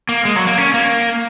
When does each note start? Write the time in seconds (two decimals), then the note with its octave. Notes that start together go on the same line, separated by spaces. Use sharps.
0.09 A#3
0.25 G#3
0.36 F#3
0.47 A#3
0.58 C#4
0.74 A#3